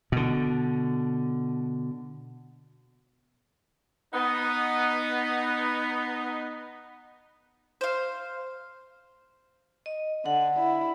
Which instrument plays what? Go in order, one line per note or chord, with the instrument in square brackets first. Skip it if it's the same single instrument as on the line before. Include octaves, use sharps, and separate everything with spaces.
[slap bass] B2 D3
[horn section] B3 D#4
[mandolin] C5 F5
[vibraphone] D#5
[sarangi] D3 [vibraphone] F#5
[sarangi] E4